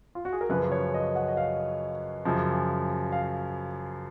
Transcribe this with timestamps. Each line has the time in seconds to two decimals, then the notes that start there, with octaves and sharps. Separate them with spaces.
0.15 F4
0.25 F#4
0.33 G#4
0.41 A#4
0.49 F#2 C#3 F3 B4
0.72 C#5
0.94 D#5
1.15 F#5
1.28 D#5
1.37 F5
2.25 F#2 C#3 F3
3.12 F5